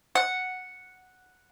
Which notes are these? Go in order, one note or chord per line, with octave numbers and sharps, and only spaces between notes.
F#5